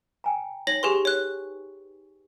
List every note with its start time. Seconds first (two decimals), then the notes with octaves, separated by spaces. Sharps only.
0.24 G5 G#5 A#5
0.67 D#4 C#5 A#6 F#7
0.83 G4 G#4 B4 G#5 C6 C#6
1.05 C#5 F#6